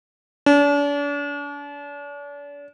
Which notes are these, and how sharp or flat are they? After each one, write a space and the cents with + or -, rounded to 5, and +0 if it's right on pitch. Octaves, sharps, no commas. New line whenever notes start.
D4 -40